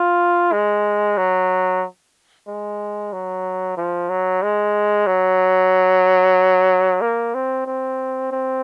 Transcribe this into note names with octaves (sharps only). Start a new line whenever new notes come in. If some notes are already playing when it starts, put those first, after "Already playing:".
Already playing: F4
G#3
F#3
G#3
F#3
F3
F#3
G#3
F#3
A#3
C4
C4
C4